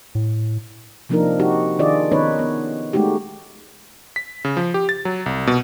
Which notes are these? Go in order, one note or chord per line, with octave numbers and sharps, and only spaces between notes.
A2
C3 F3 A#3 D4 D#4 A#4
D#4 F#4 G4
D#3 D4 F4 G#4 D5 D#5
D#3 B3 C#4 D#4 B4 C#5
B3
G#3 A3 D#4 F#4 G4
B6
C#3
F3
G4
A6
F#3
C2
B2